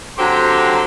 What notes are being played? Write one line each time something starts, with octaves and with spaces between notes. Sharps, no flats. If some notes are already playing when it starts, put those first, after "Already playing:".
D3 F#3 C4 G4 A#5 C6